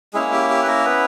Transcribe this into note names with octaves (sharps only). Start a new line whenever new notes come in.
G#3 A#3 C#4 E4 G#4
G4
G4
B4
A#3 A#4
B3 B4